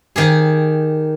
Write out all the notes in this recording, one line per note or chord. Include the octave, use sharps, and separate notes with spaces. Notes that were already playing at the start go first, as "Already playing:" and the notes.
D#3 G4 G#4